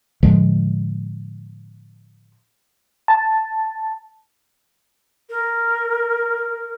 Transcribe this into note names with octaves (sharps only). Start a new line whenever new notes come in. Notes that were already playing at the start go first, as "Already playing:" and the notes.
A2 D3 F3 G#3
A5
A#4